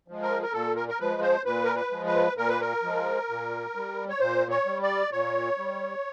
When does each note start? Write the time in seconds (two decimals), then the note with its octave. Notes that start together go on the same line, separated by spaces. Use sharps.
0.08 F3 G#3
0.22 A#4
0.42 A#4
0.53 A#2 A4
0.76 A#4
0.89 A#4
1.00 F3 G#3 B4
1.22 C5
1.45 A#2 B4
1.64 A#4
1.75 B4
1.91 F3 G#3
2.06 B4
2.36 A#2 A#4
2.49 B4
2.61 A#4
2.83 F3 G#3
3.29 A#2
3.75 G3
4.09 C#5
4.20 A#2 C5
4.50 C#5
4.66 G3
4.82 D5
5.12 A#2 C#5
5.58 G3